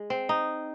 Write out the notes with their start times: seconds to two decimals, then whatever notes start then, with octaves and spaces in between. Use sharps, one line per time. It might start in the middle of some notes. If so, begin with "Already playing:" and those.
Already playing: G#3
0.10 C4
0.29 D#4